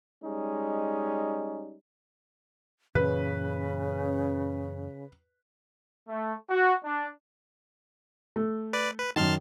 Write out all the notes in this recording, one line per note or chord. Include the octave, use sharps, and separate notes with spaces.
G3 G#3 C#4 D#4
F#2 A#2 C#3 E3 C#4 B4
A3
F#4
D4
A3
B4 D5
B4
F#2 D#3 A5 C6 F6